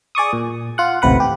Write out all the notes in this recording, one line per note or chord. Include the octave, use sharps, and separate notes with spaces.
G#4 D5 C#6 D#6
A#2
F4 F#5
A1 D#2 A2 C3 B4 F#5
G4